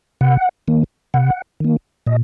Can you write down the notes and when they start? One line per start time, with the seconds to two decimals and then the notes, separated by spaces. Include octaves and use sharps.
0.21 C3 F#5
0.68 D#3 A#3
1.14 C3 F#5
1.60 D#3 A#3
2.06 A#2 D#5